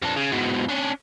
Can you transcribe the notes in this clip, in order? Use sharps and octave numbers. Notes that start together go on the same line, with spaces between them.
F2 D4
C#3
G#2 B2
C#4 D4